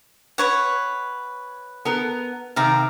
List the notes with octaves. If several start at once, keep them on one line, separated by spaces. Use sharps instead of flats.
B4 C#5 F#5
B3 A#4
C3 D#3 C4 F5 A#5